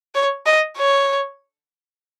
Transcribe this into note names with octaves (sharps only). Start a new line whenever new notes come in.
C#5
D#5
C#5